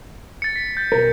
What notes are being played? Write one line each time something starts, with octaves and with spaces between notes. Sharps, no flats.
A6 C#7
B6
G6 A6
B1 A#4